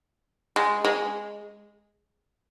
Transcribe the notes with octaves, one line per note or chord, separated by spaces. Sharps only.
G#3
G#3